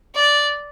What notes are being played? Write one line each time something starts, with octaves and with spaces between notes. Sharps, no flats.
D5